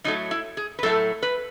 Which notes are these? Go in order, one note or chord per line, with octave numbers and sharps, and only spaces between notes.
A2 F#3 A3 D#4
E4
G#4
B4
A2 F#3 A3 A4
B4